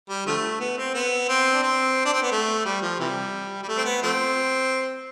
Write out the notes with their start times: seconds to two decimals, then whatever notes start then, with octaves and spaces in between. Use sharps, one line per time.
0.09 G3
0.27 D3 F3 A3
0.60 B3
0.78 C4
0.94 B3
1.29 C4
1.53 D4
1.63 C4
2.05 D4
2.14 C4
2.23 B3
2.32 A3
2.65 G3
2.82 F3
3.00 C3 E3 G3
3.63 G3
3.68 A3
3.78 C4
3.85 B3
4.03 F3 A3 C4